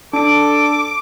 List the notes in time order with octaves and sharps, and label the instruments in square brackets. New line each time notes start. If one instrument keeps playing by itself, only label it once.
[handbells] D4 D7 [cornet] A4 [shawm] D6